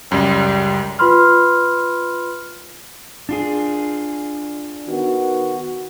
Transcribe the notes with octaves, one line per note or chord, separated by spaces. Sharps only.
C#2 F#2 G3
F4 B4 B5 C6 F6
D4 F4 G#4
D#3 B3 F#4